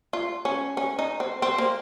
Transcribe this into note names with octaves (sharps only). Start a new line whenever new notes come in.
F4
C#4
C#4
D#4
C4
C4
A#3